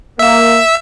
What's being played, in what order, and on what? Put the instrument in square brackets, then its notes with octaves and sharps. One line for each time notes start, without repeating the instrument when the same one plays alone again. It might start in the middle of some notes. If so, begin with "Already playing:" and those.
[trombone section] A#3 [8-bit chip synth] E5 E6